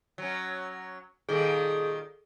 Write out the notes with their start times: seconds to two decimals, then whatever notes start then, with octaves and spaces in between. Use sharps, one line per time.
0.18 F#3 C#4
1.29 A#2 D#3 G3 G#4 A4